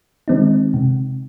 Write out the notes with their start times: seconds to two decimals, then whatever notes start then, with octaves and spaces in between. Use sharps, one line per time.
0.28 D#3 G#3 C4 D#4
0.74 C3